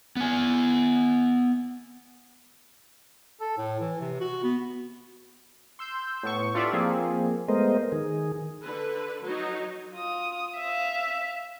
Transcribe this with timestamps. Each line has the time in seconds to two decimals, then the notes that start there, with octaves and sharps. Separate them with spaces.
0.16 B3 G#5
3.40 A4
3.58 A2
3.80 E3
4.01 C3
4.20 F#4
4.43 B3
5.79 C6 E6 G6
6.23 A2 B3 C#6
6.54 D4 F4 G4 A4 D5 E5
6.73 F3 A#3 C4 G#4
7.48 G#3 A3 B3 A#4 C5 D#5
7.92 D#3 G#4
8.62 D3 B4
9.22 F#3 D#4
9.94 F4 D#6
10.56 E5 F5